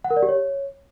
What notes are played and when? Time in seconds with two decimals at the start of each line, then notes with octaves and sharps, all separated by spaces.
0.04 F#5
0.11 A#4
0.17 D5
0.23 G4
0.29 C#5